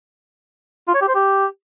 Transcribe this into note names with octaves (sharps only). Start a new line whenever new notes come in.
F4
C#5
G4
C5
G4